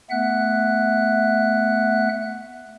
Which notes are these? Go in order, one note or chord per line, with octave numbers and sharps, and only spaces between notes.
A3 B3 E5 F#5 F#6